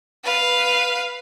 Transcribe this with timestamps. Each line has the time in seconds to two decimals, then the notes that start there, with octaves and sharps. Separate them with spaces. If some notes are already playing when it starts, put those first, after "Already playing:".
0.23 B4 F5